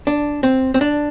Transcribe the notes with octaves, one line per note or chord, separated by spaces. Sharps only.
D4
C4
C4
D4